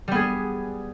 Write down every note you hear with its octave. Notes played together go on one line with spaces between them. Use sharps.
G3 B3 G#4